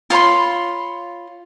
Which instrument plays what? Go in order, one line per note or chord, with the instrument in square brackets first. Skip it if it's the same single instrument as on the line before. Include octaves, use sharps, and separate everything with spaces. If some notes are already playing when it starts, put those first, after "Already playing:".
[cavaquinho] F4 C#5 B5 C6